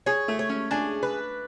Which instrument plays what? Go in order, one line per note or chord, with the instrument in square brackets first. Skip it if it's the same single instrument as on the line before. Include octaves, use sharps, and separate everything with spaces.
[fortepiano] G#4 [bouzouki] C#5
[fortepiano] A3
[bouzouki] C#5
[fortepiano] C#4
[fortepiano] D4 [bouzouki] G#4
[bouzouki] B4